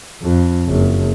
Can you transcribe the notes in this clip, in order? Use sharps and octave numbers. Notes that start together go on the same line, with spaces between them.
F2
F#1